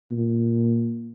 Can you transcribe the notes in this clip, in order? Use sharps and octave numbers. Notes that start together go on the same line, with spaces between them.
A#2